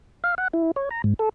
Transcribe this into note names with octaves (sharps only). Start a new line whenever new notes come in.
F5
F#5
E4
C#5
A#5
G#2
A4